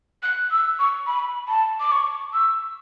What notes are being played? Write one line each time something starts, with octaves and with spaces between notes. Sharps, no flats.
F#6
E6
C#6
B5
A5
D6
C#6
E6